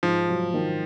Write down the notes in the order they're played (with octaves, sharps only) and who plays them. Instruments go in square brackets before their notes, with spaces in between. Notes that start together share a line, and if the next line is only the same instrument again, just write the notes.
[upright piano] G#2 [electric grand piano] F3
[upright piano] F#3
D#3